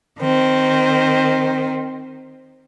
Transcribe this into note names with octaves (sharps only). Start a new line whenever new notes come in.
D#3 C4